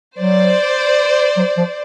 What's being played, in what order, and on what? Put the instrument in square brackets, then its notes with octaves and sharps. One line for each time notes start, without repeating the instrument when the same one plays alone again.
[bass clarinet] F#3 [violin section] C5 D5
[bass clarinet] F#3
F3